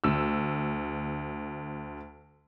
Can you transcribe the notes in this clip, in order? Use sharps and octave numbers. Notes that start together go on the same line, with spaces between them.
D2 E6